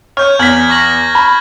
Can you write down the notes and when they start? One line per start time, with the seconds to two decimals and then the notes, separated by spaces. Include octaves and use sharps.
0.17 C#5 F6 G6
0.39 E2 F6 G#6 B6 F#7
0.70 C#6 A#6 F#7
1.15 B5